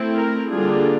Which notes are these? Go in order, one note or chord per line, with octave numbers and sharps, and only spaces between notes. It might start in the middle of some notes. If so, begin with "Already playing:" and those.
Already playing: A3 C4 E4
A#4
D3 G3 A#3 D4 F4 G#4